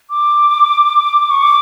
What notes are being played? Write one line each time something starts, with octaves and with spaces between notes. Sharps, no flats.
D6
C#6
D6